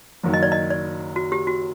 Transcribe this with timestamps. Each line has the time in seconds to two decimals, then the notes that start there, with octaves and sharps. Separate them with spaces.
0.23 F#1 F#2 D#3 F#3
0.34 D#5
0.43 D5
0.52 D#5
0.70 D5
1.16 F#4
1.32 G4
1.47 F#4